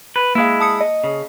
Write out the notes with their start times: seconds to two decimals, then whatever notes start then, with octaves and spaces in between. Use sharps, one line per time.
0.16 B4
0.35 G#3 A#3 E4 F5
0.60 A5 D#6 C#7
0.81 D#5
1.04 C#3